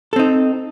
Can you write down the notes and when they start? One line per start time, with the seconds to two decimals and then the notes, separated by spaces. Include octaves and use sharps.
0.13 A4
0.16 C4
0.19 D#4